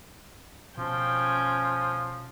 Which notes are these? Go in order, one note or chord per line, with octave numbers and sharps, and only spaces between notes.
B2 F3 C#4 G5